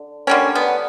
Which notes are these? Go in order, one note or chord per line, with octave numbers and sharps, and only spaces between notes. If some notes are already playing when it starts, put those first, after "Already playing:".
Already playing: D3
D3 G3 A#3 C#4
B3